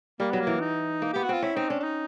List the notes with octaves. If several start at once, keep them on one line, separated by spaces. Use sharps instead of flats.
G3 A#3
F#3 B3
A#3
E3
D#4
A#3
B3 G4
F#4
C4 F4
C#4 E4
C4 D#4
C#4 D4
D4
D#4